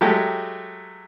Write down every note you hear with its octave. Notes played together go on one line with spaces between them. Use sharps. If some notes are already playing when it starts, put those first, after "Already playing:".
F#3 G#3 A3 G4